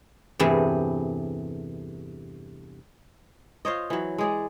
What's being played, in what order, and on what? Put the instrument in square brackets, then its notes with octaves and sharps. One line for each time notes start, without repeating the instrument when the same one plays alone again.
[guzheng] E2 G2 C3 E3 A3 G#4
[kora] F4 C5 C#5 D#5
E3 F#3
G#3 G#4 D5